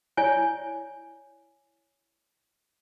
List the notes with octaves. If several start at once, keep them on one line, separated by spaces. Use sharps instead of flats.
E4 C#5 D5 G#5